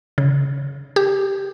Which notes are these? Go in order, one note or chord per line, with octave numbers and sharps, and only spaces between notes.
C#3
G4